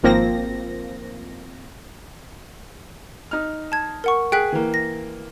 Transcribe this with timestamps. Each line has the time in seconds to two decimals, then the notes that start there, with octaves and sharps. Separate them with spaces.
0.03 G#1 F3 A#3 C4 A#6
3.31 D#4 F6
3.72 A5 G#6
4.04 A#4 F#5 C#6
4.32 G#4 G5 F#6 B6
4.52 E3 A#3
4.74 A#6